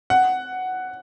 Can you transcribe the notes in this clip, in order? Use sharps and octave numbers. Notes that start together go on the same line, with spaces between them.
F#5